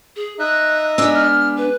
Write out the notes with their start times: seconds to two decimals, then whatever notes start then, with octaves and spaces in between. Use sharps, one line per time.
0.16 G#4
0.39 D#4 D#5 E5 F#6
0.98 G#3 B3 D4 E6
1.14 F6
1.57 B4